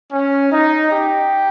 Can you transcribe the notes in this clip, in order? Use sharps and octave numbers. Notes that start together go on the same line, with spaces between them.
C#4
D#4
G4